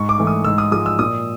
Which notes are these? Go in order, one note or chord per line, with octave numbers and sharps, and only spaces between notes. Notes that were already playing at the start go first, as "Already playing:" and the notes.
Already playing: G#2 C#6
D6
E3 A3
D#6
G#2 E6
D#6
F3 G#3 D#6
E6
A#2 D#6